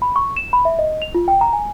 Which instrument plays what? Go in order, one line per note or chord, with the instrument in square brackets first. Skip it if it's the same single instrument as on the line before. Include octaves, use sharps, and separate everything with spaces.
[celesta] B5
C#6
E7
B5
E5
D#5
F7
F4
G5
A#5
G#5